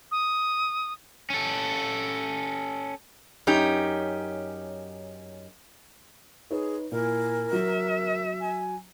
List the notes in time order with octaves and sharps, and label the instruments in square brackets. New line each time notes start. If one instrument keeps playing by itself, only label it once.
[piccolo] D#6
[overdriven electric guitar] C#4 A4
[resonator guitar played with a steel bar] F#2 C#4 D#4 G4
[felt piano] D#4 B4 C#5 [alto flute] G#4
[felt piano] A#2 [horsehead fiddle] E4 G#5 [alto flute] A#4
[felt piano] F#3 [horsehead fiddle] E5
[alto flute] G#5